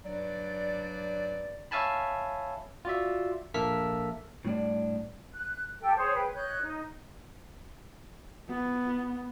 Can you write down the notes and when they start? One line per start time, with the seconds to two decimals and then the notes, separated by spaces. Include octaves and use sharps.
0.04 G2 F#3 D5
1.71 C#5 E5 F5 G#5 A5 B5
2.85 F4 F#4 D5 E5
3.54 A#1 A#3 A4 E5 F6 B6
4.45 A2 G3 D4 D5
5.33 F#6
5.80 G4 A4 G5
5.96 G#4 C5 C#5
6.15 B4 G5
6.34 C#5 D#5 F#6 G6
6.61 D#4
8.49 B3